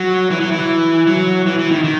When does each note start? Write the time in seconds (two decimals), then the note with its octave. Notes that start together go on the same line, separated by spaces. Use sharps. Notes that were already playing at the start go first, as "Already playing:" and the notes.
Already playing: F#3
0.30 E3
0.40 F#3
0.51 E3
1.07 F#3
1.46 E3
1.59 E3
1.71 D#3
1.84 D#3